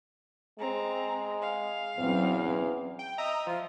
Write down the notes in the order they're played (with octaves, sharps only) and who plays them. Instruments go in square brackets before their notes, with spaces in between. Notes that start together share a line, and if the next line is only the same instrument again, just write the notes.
[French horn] G#3 [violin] C4 A#5
[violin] F5
[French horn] E2 [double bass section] F#3 C4 C#4
[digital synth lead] G5
[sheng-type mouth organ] D#5 E5 D#6 [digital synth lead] A#5
[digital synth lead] F3 [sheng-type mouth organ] F4